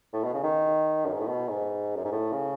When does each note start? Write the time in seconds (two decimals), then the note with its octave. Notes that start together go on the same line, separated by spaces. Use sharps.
0.13 A2
0.24 B2
0.34 C#3
0.43 D#3
1.06 F#2
1.13 G#2
1.20 A2
1.28 B2
1.49 G#2
1.96 F#2
2.05 G#2
2.12 A2
2.32 C#3